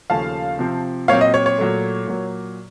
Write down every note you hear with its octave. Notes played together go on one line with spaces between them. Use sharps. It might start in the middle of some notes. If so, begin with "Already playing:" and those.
D#2 C#3 F3 A3 C#4 F5 A5
C3 F3 C4
A#2 F#3 C4 C#5 F5
D#5
C#5
C#5
A#2 F#3 A3
A#2 F#3 A#3